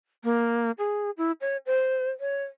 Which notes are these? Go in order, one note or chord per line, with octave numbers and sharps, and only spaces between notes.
A#3
G#4
E4
C#5
C5
C#5